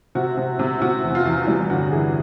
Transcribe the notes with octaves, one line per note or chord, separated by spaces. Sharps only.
C3 F#4
C3
C3
C3 F#4
E2
F4
E2
G3 F4
G1 F#4
E3 G#4